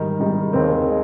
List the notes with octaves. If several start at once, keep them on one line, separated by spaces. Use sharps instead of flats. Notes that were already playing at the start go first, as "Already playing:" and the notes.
Already playing: G#2 D#3 G3
G#2 D#3 G3
D#2 D#3 G#3 C4
G#3